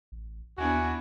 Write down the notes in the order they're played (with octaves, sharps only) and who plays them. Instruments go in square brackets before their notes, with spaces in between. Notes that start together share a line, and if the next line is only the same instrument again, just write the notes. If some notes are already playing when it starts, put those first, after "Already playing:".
[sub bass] A1
[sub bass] D#2 [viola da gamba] B3 D4 E4 [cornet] F#4 [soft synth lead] G#5